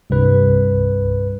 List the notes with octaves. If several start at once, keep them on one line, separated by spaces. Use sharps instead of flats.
C2 G2 B4